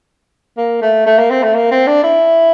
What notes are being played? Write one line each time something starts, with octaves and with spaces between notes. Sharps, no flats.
A#3
A3
A3
A#3
C4
A3
A#3
C4
D4
E4